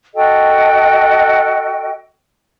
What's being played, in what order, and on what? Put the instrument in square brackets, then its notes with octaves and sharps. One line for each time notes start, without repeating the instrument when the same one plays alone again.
[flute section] F#4 A4 D#5 G5